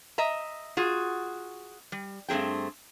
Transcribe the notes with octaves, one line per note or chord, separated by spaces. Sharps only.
D#5 E5 A#5
F4 F#4 G#4
G3
G2 A3 C4 G#4 G5